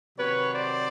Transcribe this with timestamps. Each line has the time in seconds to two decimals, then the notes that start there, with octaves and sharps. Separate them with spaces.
0.18 C3 D#3 F#3 B4 C#5
0.52 C5 D5